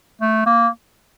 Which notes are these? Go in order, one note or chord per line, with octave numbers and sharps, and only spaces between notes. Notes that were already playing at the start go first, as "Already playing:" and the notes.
A3
A#3